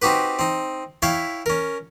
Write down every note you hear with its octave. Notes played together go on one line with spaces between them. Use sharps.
C4 D#4 F#4 G4 B4
C4 D#4
E4 C#5 E5 F5 G5
C#4 A#4